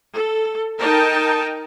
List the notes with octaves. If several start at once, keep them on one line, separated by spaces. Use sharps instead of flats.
A4
D#4 A#4 G5 A5